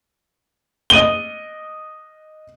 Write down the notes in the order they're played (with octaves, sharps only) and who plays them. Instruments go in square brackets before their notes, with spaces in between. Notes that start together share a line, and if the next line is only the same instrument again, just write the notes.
[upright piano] D#5 D#7 G7